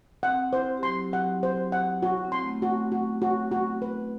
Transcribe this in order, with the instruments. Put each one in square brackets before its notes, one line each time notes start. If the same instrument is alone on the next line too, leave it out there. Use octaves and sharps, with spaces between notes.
[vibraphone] C4 [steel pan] F#5
[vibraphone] E4 [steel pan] C5
[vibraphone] G4
[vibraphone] F#3 F#4 [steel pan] C6
[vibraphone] F#3 F#4 [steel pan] F#5
[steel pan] C5
F#5
[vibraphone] E4 [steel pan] F#4
[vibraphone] C4
[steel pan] C6
[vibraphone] A3
B3
[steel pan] F#4
[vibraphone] A3
[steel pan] F#4
F#4
F#4
B4